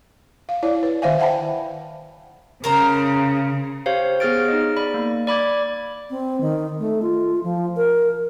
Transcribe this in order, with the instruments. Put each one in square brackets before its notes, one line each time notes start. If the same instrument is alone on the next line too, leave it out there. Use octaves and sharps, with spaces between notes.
[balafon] F5
E4 C#5 D5
B4
D#3 C5 E5 F5 G#5
E5 F#5 G5 A5 B5
[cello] C#3 [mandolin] A#4 C5 A#5
[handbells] G4 C5 C#5 F5
B3 G#4 C#5 F6 A6 D7
D#4 D#5
D5 B5
A#3
D5 B5 D6 G#6
[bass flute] C4
D#3
A3
F4
F3
A#4